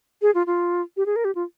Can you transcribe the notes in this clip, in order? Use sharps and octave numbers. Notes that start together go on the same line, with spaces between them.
G#4
F4
F4
G4
G#4
A#4
G4
F4